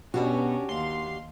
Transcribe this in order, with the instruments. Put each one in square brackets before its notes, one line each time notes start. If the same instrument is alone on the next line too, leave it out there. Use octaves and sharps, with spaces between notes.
[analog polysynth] B2 [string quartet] C#4 [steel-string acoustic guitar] D4 F#4 G4
[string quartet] D#2 F5 [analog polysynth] C6